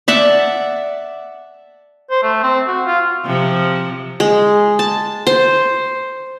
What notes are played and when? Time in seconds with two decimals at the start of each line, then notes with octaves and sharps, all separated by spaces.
0.08 D5 E5 F#5 A5
2.11 C5
2.23 A3
2.43 C4
2.68 F#4
2.86 F4
3.25 C3 F3
4.20 G#3
4.79 A5
5.27 C5